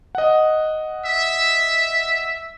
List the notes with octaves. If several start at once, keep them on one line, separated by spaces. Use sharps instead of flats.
D#5 F#5
E5